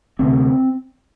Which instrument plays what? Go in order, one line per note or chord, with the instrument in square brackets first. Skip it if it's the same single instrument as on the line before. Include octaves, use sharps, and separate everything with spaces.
[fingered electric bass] D2 C3 C4